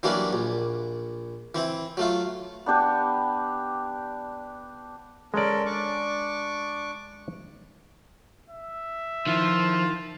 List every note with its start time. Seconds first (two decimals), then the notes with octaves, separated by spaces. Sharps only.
0.03 E3 F#3 G3 A#3 C#4 D4
0.33 A#1
1.55 E3 C4 E4
1.97 F#3 A3 F4
2.66 B3 D4 G4 B4
5.34 G#3 C#4 A4 A#4 D5
5.66 D4 C#6 D6
8.50 E5
9.27 D#3 F3 E4 F4